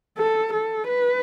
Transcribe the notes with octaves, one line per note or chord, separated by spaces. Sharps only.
A4
A4
B4